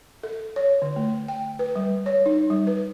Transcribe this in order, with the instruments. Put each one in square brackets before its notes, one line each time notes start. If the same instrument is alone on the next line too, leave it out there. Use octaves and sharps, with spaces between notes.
[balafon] A4
C#5
D3
A3
G5
B4
G3
C#5
D#4
G3
B4